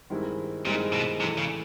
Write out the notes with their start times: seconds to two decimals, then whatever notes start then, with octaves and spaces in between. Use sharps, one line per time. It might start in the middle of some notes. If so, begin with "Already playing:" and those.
0.10 G2 D#3 G#3 C4 E4
0.65 G2 A#2 D#3 G#3 C4 E4
0.93 B2
1.20 A2 C3 E3 A3
1.38 C#3